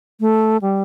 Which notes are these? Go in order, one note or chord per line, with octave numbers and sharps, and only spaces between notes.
A3
G3